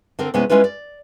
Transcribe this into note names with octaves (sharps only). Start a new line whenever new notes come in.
D3 C4 A#4
C3 G#3 B3 C#4 E4 G#5
G#3 C#4 E4 F4 B4
D5